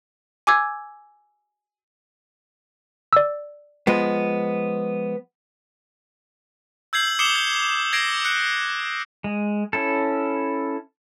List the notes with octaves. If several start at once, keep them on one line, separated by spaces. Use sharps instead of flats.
G#5 D6 E6 G#6
D5 E6
F3 G#3 B3
E6 G6 G#6 C7 F#7
D6 D#6 C7 C#7 E7 G7
G6
G#6 A#6 C7 D7
F#6 C#7
G#3
C#4 E4 A4